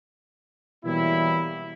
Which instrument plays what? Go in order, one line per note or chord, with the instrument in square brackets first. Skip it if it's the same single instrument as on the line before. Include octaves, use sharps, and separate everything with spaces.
[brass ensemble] B2 E3 F#3 G3 A#3 E4